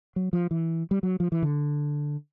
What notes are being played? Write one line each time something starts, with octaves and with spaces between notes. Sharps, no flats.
F#3
F3
E3
G3
F#3
F3
E3
D3